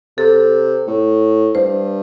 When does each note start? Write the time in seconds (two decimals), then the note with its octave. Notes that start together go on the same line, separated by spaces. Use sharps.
0.18 C3 A4
0.87 A2
1.55 G2 C5